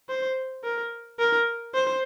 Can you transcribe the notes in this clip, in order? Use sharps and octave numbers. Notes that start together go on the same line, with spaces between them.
C5
A#4
A#4
C5